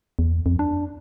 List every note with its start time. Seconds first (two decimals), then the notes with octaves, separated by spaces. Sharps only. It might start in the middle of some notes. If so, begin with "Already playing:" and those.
0.19 E2
0.46 F2
0.59 D4